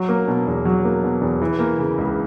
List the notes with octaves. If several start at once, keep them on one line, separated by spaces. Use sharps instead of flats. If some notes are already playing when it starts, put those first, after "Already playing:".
Already playing: F#3
A#3
B2
E2
F#3
A#3
B2
E2
E3
A#3
C#3
C#2